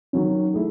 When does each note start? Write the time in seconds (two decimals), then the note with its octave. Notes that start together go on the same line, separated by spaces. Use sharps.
0.13 D#3 F#3 C#4
0.54 A3 E4 G#4